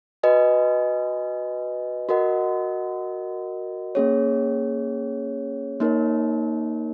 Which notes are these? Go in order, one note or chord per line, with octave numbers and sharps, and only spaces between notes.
F#4 B4 D#5 G#5
F#4 A#4 D#5 F#5
A#3 C#4 G#4 C#5
A#3 D#4 A#4 C#5